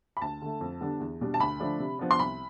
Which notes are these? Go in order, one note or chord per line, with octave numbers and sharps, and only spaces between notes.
B5
D2 A5
D3 A3
F2
D3 G3 B3 D4
E2
B2 G3 D4
A5
D2 B5
D3 F3 A3 D4
C3
F3 B3 D4
C6
C2 B5